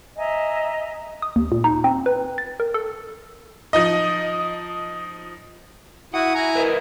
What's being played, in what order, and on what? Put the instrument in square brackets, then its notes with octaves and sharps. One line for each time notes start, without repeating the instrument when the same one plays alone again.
[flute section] D#5 E5 G#5 A#5
[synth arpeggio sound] D#6
D#2
A#2
D#4
C4
B4
A6
A#4
A4
[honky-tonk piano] F3 D#4 D#5
[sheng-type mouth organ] E4 F#4 D#6 [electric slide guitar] F#5
[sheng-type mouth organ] E4 G#5 A#5
[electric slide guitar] A#4 B4 D#5